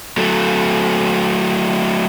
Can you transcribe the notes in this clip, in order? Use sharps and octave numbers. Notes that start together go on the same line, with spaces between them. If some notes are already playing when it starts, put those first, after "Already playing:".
F#3 A3